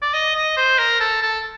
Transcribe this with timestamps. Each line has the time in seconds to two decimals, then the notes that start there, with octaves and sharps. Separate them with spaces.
0.02 D5
0.14 D#5
0.35 D#5
0.57 C5
0.79 A#4
1.00 A4
1.22 A4